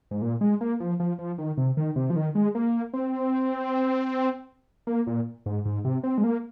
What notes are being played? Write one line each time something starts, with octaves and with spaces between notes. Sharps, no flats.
G#2
A#2
G#3
A#3
F3
F3
F3
D#3
C3
D#3
C3
F3
D#3
G#3
A#3
C4
A#3
A#2
G#2
G#2
C3
C4
G#3
A#3